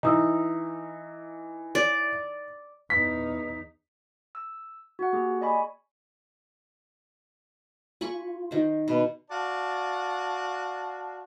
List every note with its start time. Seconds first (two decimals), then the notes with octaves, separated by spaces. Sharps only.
0.03 E3 D#4 A#5 D#6 E6
1.75 D5
2.90 E2 D#4 B6
4.35 E6
4.99 F#4 F#5
5.13 A#3 G4 G#4
5.41 D5 D#5 G#5 B5 C#6
8.01 F4 G#5 B5 C#6
8.51 D#3 C5
8.88 B2 B5
9.30 F#4 D5 F5 A5